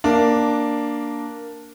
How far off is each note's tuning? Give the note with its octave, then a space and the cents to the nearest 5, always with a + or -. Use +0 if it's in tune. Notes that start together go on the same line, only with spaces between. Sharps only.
A#3 +0 D4 +0